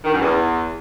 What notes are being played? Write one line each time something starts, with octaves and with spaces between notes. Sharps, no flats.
D#3
F#2
E2